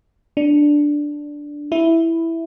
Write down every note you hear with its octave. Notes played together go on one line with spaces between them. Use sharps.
D4
E4